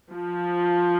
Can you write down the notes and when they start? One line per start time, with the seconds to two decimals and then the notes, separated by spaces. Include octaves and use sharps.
0.12 F3